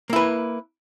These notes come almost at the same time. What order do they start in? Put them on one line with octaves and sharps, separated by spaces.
A#3 E4 B4